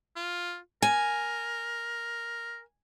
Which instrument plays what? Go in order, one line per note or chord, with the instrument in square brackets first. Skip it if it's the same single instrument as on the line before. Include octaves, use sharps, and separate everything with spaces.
[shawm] F4
[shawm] A#4 [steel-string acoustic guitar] G#5